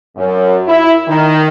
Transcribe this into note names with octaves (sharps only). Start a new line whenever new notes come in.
F#2
E4
D#3